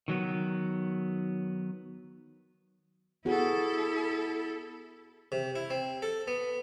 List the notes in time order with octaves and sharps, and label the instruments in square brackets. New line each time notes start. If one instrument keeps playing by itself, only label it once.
[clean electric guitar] D#3 F#3 B3
[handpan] B3 F#4 G#4 [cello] E4 A4
[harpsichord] C3
E4
C4
A4
B3